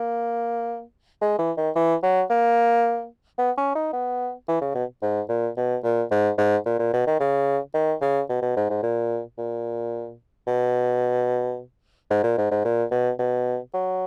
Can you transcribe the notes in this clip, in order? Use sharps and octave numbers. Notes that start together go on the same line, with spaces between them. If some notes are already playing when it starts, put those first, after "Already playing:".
Already playing: A#3
G#3
E3
D#3
E3
F#3
A#3
B3
C#4
D#4
B3
E3
C#3
B2
G#2
A#2
B2
A#2
G#2
G#2
A#2
A#2
B2
D#3
C#3
D#3
C#3
B2
B2
G#2
G#2
A#2
A#2
B2
G#2
A#2
G#2
G#2
A#2
B2
B2
F#3